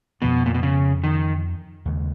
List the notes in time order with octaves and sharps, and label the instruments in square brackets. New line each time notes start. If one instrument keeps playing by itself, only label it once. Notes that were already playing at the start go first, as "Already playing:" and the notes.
[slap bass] F2 F3 B3 [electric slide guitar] B2
[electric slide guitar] A#2
B2
C#3
D#3
[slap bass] D#2 C#3 G#3